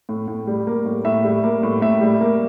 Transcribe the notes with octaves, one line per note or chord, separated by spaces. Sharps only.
A2
A2
G3
A#3
A2
A2 E5
G3
A#3
A2
A2 E5
G3
A#3